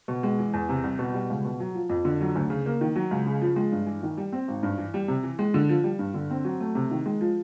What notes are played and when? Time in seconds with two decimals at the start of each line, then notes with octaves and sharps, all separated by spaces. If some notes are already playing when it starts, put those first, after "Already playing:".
0.08 B2
0.23 G#3
0.38 E3
0.53 E2
0.69 C3
0.84 C2
0.99 B2
1.14 G3
1.30 C#2
1.44 B2
1.60 F#3
1.75 F3
1.89 F2
2.05 D3
2.21 F#3
2.36 D2
2.50 C#3
2.66 A#3
2.81 D#3
2.95 F#3
3.11 C#2
3.27 C#3
3.41 F3
3.56 G#3
3.72 G2
3.87 E3
4.03 D#3
4.17 G3
4.32 C4
4.48 G#1
4.63 G2
4.78 E3
4.94 G3
5.08 C3
5.23 E3
5.39 G#3
5.54 D3
5.69 F3
5.84 G3
5.99 G2
6.14 D3
6.30 C4
6.44 F#3
6.60 A3
6.75 C3
6.91 D#3
7.06 G#3
7.21 F3